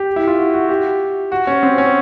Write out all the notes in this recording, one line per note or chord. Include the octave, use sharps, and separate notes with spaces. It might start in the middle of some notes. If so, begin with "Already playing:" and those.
Already playing: G4
E4
F4
F#4
F#4
G4
F#4
C#4
C4
C#4